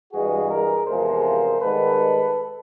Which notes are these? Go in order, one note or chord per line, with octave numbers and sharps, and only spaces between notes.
G2 E3 G#3 F#4 G#4
G#4 A#4
E2 C3 F3 G#3 A#4 C5
G#2 D#3 G3 A4 B4